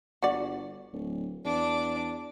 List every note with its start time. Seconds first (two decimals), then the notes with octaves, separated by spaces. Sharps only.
0.23 G1 F#4 D5
0.93 D1
1.45 E2 D4 D6